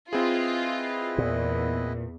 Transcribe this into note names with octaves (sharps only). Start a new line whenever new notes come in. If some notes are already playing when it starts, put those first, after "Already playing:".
C4 E4 F4 G#4 B4 D#5
E2 A#2